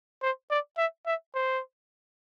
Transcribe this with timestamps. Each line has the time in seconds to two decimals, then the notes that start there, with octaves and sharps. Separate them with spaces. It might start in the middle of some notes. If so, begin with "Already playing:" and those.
0.22 C5
0.51 D5
0.78 E5
1.06 E5
1.35 C5